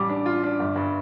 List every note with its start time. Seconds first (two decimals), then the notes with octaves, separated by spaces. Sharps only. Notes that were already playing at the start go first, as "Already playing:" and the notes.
Already playing: A1 G3 D6
0.09 D4
0.26 F4
0.43 D4
0.60 G1
0.76 G2